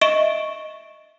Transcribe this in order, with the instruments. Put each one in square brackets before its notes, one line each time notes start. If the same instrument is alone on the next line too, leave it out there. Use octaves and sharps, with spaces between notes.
[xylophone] D#5 E5 C#6 D7 E7 G7